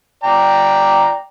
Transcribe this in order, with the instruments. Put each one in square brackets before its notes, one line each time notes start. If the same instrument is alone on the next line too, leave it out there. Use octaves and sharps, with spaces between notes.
[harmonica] D5 G5 A#5